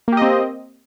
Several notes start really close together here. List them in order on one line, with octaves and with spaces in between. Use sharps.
A#3 G4 D#5 C4